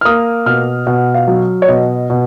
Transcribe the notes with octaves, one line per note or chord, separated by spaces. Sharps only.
F6
A#3 D#6
B2 F6
B2 F#5
F5
F#3
C#5
B2 D#5
B2